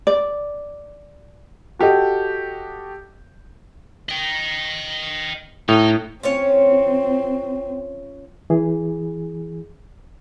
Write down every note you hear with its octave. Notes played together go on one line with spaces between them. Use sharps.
D5
F#4 G4 A4 D#5
D#5 G5
A2 D#4
C4 C#4 F4 C#5
E3 G#4